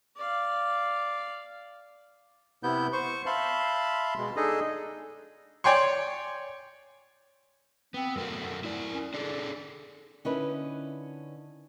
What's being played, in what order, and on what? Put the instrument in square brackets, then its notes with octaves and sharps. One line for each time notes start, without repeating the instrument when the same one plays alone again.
[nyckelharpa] D5 F5
[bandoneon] C3 B3 E4 G6
C5 C#6
E5 F5 A5 B5 C6
B2 G#3
D4 D#4 G#4 A4 D#5
[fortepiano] C#5 D5 G5 G#5 C6 C#6
[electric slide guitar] B3 [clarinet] C4
[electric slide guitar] F#2 A3 F#4 [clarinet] A#4
[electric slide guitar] E4 D5
[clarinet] C#4
[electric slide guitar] D4 G#4 A4 [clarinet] D5
[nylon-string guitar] D3 C#4 D#4 E4 A#4 B4